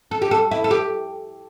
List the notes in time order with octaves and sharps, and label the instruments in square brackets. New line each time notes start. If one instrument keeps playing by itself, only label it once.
[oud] A4
G4
A4
E4
A4
G4